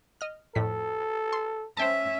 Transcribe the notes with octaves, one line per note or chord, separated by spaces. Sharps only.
D#5 F6
F2 A2 A4 B6
C6
C#4 C5 E5 G5 A5